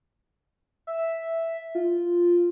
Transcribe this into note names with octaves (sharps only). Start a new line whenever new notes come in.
E5
F4